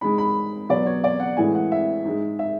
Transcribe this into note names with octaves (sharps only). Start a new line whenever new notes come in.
G#2 G#3 B5
B5
B2 F#3 D5
C#5
D5
F#5
A2 E3 G#3 G#5
F#5
E5
G#2 G#3
E5